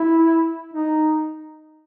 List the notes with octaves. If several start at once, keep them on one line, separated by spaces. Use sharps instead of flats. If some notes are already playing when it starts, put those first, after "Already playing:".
Already playing: E4
D#4